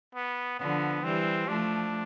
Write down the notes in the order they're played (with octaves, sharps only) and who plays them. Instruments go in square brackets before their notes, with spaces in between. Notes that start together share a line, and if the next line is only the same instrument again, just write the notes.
[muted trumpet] B3
[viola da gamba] D3 F3 [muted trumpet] B3
[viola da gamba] E3 G3 [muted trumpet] C4
[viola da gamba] F3 A3 [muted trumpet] D4